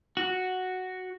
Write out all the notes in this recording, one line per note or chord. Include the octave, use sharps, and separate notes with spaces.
F#4